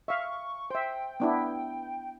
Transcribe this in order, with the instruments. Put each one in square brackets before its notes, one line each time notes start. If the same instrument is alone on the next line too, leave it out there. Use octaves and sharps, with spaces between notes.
[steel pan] E5 F5 [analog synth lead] C#6
[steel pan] C5 E5 [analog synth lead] G5
[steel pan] B3 D4 E4